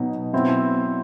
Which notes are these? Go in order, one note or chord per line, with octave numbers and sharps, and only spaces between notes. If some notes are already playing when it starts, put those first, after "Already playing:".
Already playing: B2 F#3 B3 D#4
F#3 C4 E4